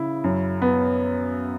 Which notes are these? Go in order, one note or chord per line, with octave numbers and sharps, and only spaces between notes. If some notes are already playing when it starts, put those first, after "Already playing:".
Already playing: C#3 E4
F#2
B3